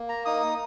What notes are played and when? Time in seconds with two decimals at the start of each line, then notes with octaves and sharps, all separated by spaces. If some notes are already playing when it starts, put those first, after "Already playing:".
Already playing: A#3
0.09 A#5
0.26 D#4 D#6